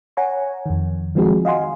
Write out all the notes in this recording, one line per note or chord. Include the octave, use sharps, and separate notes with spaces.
C#5 F#5 G#5 A#5 C#6
F2 D#3
D#3 F3 G#3 C4 F#4 G#4
D#5 F5 F#5 G#5 C6